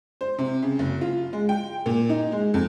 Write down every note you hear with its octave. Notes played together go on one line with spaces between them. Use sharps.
C5
C3
C#3
F#1
F4
G#3
G5
A#2
D#4
G#3
F2